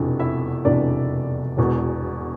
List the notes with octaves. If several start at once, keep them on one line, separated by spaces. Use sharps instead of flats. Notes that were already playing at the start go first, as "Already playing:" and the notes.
Already playing: F1 E2 B2 D4
E4 E5
F1 E2 B2 D4 D5
E1 E2 B2